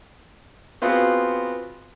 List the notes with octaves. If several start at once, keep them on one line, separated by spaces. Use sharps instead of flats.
B3 C4 F4 F#4 G#4 B4